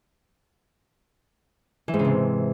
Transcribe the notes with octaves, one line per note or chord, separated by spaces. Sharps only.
E3
G#2
C#3
C3